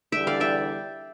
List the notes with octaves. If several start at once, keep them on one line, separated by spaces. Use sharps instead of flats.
E2 D3 G3 E5 G5
D5 F5
E5 G5